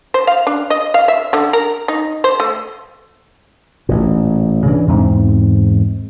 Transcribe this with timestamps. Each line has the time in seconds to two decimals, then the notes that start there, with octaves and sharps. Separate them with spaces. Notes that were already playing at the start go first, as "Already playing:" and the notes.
0.14 C5
0.27 F5
0.47 D4
0.70 D#5
0.94 F5
1.08 E5
1.33 D3
1.53 A#4
1.88 D#4
2.24 C5
2.40 A3
3.89 A1 A#2
4.66 C#3 E3 C4 D4
4.88 E2 G#2 C4